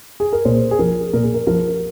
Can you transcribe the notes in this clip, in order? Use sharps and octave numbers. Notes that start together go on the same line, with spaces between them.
G#4
A#4
A#2 C5
G#4
F3 A#4
A#2 A#4
G#4
A#4
F3 A#4